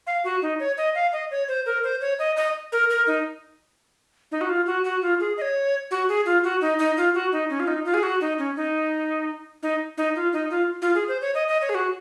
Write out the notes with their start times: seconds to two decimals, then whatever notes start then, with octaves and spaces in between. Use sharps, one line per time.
0.07 F5
0.24 F#4
0.42 D#4
0.60 C#5
0.78 D#5
0.95 F5
1.13 D#5
1.31 C#5
1.48 C5
1.66 A#4
1.84 C5
2.01 C#5
2.19 D#5
2.36 D#5
2.72 A#4
2.90 A#4
3.07 D#4
4.32 D#4
4.41 F#4
4.49 F4
4.66 F#4
4.84 F#4
5.02 F4
5.20 G#4
5.38 D#5
5.42 C#5
5.91 F#4
6.09 G#4
6.26 F4
6.44 F#4
6.61 D#4
6.79 D#4
6.97 F4
7.14 F#4
7.32 D#4
7.50 C#4
7.60 F4
7.68 D#4
7.85 F4
7.94 G#4
8.03 F#4
8.21 D#4
8.38 C#4
8.56 D#4
9.63 D#4
9.97 D#4
10.16 F4
10.33 D#4
10.50 F4
10.82 F4
10.95 G#4
11.08 C5
11.22 C#5
11.35 D#5
11.48 D#5
11.62 C#5
11.69 G#4
11.75 F#4